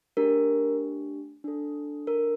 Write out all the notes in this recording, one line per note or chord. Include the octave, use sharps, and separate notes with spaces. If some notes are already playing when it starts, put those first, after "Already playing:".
A3 D4 G4 A#4
D4 A4
A#4